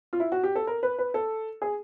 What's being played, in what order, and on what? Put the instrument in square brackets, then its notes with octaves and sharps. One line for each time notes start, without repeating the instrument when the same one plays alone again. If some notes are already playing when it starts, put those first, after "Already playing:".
[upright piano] F4
E4
F#4
G4
A4
A#4
B4
B4
A4
G#4